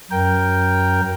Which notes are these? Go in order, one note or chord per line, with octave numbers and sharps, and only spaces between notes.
F#2 A#4 G5